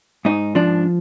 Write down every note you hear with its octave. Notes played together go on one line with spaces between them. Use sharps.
G#2 D#4
F3 D4